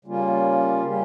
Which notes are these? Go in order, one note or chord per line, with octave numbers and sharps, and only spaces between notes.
C#3 G3 A#3 C#4 F4
C#3 G3 C#4 G4